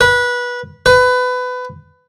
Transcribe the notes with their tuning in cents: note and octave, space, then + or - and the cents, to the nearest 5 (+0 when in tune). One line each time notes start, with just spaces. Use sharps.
B4 -20
B4 +20